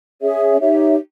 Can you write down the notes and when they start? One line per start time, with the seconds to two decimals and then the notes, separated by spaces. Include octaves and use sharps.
0.22 C#4 G#4 C#5 E5
0.60 D#4 G4 C#5 E5